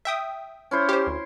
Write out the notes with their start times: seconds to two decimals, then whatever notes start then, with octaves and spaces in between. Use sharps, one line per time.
0.05 E5 G5 D#6
0.71 C#4 E4 C5
0.89 G4 C5 C6
1.07 D2